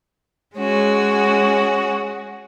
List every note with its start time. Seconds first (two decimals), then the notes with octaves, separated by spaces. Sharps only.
0.56 G#3 C#4 F#4